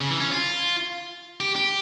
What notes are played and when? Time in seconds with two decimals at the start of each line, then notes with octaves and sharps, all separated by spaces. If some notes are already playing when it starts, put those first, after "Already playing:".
0.01 C#3
0.10 E3
0.20 C#4
0.32 F4
1.40 G4
1.56 G4